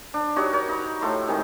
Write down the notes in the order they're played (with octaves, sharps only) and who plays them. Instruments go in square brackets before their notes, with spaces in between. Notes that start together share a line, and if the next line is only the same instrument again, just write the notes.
[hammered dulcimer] D4
D#4 F#4 G4 C#5
A#4 C#5
D#4 B4
A2 A4 C6 D6
D#3 G#3 C4 D#4